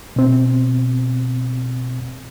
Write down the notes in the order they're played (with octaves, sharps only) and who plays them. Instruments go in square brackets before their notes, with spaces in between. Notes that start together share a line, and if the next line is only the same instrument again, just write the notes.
[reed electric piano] B2 C4